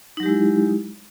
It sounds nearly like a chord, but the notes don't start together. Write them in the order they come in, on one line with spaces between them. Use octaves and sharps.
D#4 F#3 G4 G#3 E4